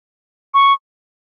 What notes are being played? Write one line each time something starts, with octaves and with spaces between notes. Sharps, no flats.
C#6